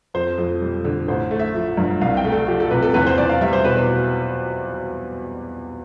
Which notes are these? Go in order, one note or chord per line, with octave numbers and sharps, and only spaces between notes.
F2 C5
F2
G3
D3
A1 C5
A3
E5
F3
G2
C2 F5
G5
A3
A4
F3 G4
A4
C3 B4
A4
E2 B4
C5
E2 D5
F5
G3 E5
C5
B2 B4